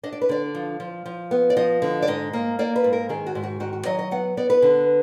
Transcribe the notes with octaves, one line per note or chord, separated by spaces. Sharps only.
D4 D#5
D5
B4
D3 D5
F3
F3
F3
B3
D5
F3 D#5
D3
D5
G#2 D#5
A#3
A#3 D5
B4
G#2
A#4
D#3 G#4
F#4
G#2
F#4
D#3 F#4
F#4
F#3 D#5
D#5
B3 F#5
B3 D5
B4
D3